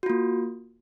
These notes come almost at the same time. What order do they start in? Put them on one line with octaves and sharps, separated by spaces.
F#4 F4 A#3